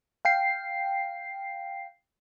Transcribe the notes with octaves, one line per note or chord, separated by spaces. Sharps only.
F5 G5 C7